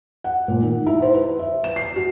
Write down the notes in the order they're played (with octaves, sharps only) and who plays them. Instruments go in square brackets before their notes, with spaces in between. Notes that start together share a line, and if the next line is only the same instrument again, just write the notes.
[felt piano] F#5
A#2
D#3
E4
C5
B4
E5
E7
C7
F#4